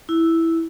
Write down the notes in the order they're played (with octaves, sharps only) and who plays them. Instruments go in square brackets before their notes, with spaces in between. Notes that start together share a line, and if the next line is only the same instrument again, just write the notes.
[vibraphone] E4